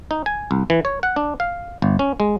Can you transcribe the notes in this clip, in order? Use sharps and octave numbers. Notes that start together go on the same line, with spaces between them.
D#4
G#5
C2
E3
C#5
F#5
D4
F5
G1
C#4
G#3